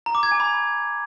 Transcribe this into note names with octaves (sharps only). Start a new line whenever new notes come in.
A#5
D6
G#6
G#5
B5